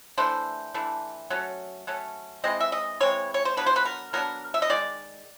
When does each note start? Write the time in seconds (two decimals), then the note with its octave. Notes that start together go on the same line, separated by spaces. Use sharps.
0.18 E3 A3 D4 C5
0.74 E3 A3 D4
1.30 F#3 A3 C#4
1.87 F#3 A3 C#4
2.44 E3 G#3 C4 D#5
2.60 E5
2.72 D#5
3.00 E3 G#3 C4 C#5
3.34 C#5
3.45 C5
3.57 F#3 B3 D4 B4
3.66 C5
3.76 B4
3.85 A#4
4.13 F#3 B3 D4 A#4
4.54 E5
4.62 D#5
4.70 D#3 G#3 D5